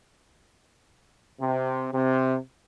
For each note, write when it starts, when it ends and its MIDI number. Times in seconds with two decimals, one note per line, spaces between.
1.42 1.89 48
1.93 2.38 48